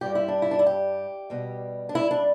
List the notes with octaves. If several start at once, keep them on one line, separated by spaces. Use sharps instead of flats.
G2 G3 G4
E4
D4
E4
D4
E4
G4
B2 G3
D4
E4
D4